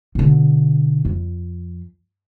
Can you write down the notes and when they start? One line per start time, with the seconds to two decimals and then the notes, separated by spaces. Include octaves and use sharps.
0.15 B2 D3
1.05 F2